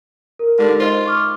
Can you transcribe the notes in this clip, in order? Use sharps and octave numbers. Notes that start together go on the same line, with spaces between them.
A#4
D3 G#3 D#4 G4
F4 C5 D#5
C#6 D6 F6